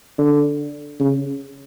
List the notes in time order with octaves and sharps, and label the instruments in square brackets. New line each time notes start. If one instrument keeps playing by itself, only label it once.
[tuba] D3
C#3